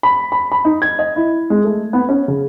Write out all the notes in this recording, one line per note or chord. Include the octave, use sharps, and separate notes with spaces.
B5
B5
B5
D#4
G#6
D#5
E4
G#3
A3
B3
C#4
C#3